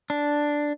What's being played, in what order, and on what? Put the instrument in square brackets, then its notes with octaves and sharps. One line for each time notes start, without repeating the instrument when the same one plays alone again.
[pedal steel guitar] D4